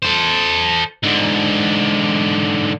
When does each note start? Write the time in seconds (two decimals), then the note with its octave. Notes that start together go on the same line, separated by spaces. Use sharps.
0.03 A4 C5
1.03 G#2 D3